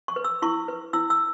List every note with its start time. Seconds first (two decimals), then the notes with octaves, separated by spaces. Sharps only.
0.08 C#6
0.16 B4
0.24 E6
0.42 E4 C#6
0.68 B4
0.93 E4 E6
1.10 E6